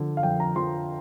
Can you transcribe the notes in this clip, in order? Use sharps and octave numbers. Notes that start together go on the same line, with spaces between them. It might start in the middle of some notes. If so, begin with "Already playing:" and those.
Already playing: D3 F3
F5
F2 G5
A#5
F3 C6